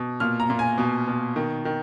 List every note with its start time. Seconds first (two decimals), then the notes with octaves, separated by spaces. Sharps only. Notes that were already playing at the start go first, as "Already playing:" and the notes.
Already playing: B2
0.20 A#2 F6
0.40 A#5
0.50 A#2
0.59 G#5
0.78 B2
1.08 B2
1.36 D#3
1.65 D#3